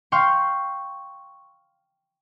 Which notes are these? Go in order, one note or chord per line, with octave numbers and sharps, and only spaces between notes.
F5 G5 C6 C#6 F6